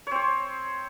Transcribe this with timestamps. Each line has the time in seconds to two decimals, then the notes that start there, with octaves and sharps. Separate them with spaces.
0.07 C#5
0.11 C4
0.16 C5